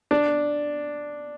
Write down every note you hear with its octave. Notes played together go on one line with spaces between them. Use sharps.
D4